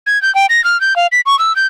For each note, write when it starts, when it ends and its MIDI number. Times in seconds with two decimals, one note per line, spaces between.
0.06 0.21 92
0.22 0.33 91
0.35 0.46 79
0.49 0.63 94
0.64 0.79 89
0.81 0.96 91
0.96 1.07 77
1.12 1.21 95
1.26 1.38 85
1.39 1.55 88
1.56 1.67 91